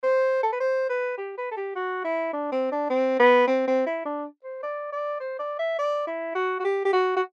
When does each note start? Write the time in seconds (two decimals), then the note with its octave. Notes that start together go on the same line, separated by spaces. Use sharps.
0.03 C5
0.43 A4
0.52 B4
0.60 C5
0.89 B4
1.18 G4
1.37 B4
1.51 A4
1.57 G4
1.76 F#4
2.04 E4
2.33 D4
2.52 C4
2.72 D4
2.90 C4
3.19 B3
3.47 C4
3.67 C4
3.86 E4
4.05 D4
4.44 C5
4.63 D5
4.92 D5
5.20 C5
5.39 D5
5.59 E5
5.79 D5
6.07 E4
6.35 F#4
6.60 F#4
6.65 G4
6.85 G4
6.93 F#4
7.16 F#4